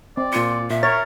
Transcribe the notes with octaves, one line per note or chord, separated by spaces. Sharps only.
C4 D5
A#2 F4 C#7
A#2 E5
A#4 C#5 A6